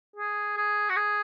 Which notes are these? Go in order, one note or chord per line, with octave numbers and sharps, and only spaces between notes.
G#4
G#4
F#4
G#4